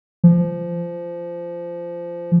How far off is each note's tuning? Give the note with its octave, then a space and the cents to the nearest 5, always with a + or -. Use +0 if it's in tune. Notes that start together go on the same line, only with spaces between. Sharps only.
F3 -20